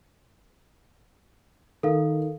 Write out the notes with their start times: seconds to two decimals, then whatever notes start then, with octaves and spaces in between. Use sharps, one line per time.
1.83 D#3 A4 A#4 F5